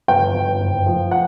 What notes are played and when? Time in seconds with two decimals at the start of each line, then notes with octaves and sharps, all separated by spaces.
0.08 G1 G5
0.34 G1
0.60 F#1
0.86 F3
1.11 F#5